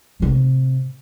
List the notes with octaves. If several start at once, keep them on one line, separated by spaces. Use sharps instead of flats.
A2 C3